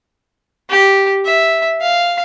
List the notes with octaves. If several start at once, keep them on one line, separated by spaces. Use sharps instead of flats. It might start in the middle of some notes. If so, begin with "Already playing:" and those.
G4
E5
F5